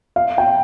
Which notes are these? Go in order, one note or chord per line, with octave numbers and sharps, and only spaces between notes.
F5
G5